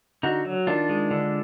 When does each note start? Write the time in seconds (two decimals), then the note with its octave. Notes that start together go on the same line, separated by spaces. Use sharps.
0.23 D3 D#4 F#4
0.45 F#3
0.67 D#3 D4 F4
0.89 G#3
1.11 D3